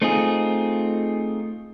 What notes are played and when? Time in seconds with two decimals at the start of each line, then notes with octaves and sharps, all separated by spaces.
0.02 A3 C4 D#4 F4 G#4